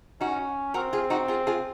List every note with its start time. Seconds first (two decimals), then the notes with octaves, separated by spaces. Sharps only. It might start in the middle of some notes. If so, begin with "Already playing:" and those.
0.21 C#4 D#4 F#4
0.74 C4 F#4 A#4
0.93 F4 G#4
1.10 D#4 F#4
1.28 F4 G#4
1.47 F4 G#4